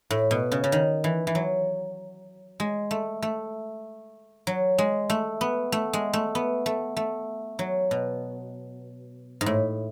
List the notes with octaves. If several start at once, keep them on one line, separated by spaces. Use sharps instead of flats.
A2
B2
C#3
C#3
D#3
E3
E3
F#3
G#3
A3
A3
F#3
G#3
A3
B3
A3
G#3
A3
B3
A3
A3
F#3
B2
G#2
A2